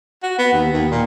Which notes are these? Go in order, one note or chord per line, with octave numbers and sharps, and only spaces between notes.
F#4
B3
D#2
D#2
A#2